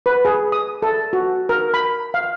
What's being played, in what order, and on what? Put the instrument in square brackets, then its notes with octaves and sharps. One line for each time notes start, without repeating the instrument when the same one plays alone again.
[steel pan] B4
G#4
D#6
A4
F#4
A#4
B5
F5